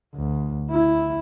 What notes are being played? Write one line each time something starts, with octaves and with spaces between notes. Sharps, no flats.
D2
E4